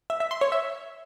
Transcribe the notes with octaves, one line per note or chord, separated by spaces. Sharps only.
E5
E5
C6
C#5
E5